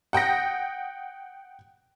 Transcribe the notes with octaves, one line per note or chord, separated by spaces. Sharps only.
F#5 G5 D#6 A#6